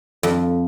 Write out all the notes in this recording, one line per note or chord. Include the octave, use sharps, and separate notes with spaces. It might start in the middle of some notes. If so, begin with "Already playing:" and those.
F2